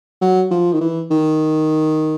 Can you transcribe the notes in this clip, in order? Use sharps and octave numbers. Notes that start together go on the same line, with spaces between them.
F#3
F3
D#3
E3
D#3